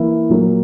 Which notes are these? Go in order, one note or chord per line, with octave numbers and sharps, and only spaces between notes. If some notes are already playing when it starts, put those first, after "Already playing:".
Already playing: E3 A#3 E4
A#2 F#3 A#3